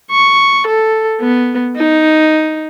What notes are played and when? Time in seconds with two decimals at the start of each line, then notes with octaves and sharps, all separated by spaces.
0.11 C#6
0.68 A4
1.21 B3
1.77 D#4